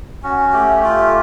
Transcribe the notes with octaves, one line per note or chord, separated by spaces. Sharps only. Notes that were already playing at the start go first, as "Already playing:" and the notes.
C#4 F#4
A3 G4
F4 G4